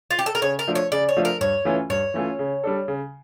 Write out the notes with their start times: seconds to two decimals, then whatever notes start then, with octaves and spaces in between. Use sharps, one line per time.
0.11 F4
0.19 G4
0.26 A4
0.35 A#4
0.42 C#3 C#5
0.59 A#4
0.67 F3 A3 D4 F4
0.75 C#5
0.92 C#3 D5
1.09 C#5
1.17 F3 A3 D4 F4
1.25 A#4
1.41 G2 C#5
1.65 E3 A3 C#4 F4
1.90 G2 C#5
2.14 E3 A3 C#4 F4
2.39 C#3
2.63 G3 D4 A4
2.88 C#3